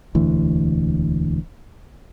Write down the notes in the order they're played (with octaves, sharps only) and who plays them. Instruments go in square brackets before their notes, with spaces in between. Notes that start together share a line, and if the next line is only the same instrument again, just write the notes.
[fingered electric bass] E1 D2 E3